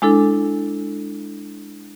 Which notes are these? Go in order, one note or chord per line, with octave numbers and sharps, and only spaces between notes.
G#3 D4 E4 A4